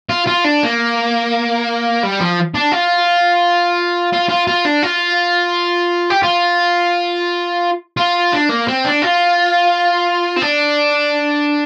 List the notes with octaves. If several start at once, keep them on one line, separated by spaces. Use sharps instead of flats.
F4
F4
D4
A#3
G3
F3
D4
F4
F4
F4
F4
D4
F4
G4
F4
F4
D4
A#3
C4
D4
F4
C4
D4